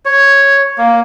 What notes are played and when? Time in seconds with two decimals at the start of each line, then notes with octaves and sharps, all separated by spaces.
0.05 C#5
0.78 A#3